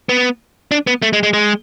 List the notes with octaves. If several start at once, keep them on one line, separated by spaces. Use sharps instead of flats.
B3
D4
B3
A3
G#3
G#3
G#3